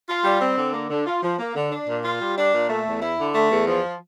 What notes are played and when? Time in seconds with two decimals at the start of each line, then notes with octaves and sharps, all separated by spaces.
0.08 F4
0.24 G3
0.41 C4
0.57 D3
0.73 A#3
0.90 D3
1.06 F4
1.23 F3
1.39 A#3
1.55 D3
1.71 D4
1.88 A#2
2.04 F4
2.20 G3
2.37 D4
2.53 A#2
2.70 A3
2.86 E2
3.02 E4
3.19 D3
3.35 A3
3.51 E2
3.67 F3